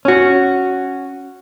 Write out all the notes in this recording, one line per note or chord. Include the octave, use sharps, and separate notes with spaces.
C#4 F#4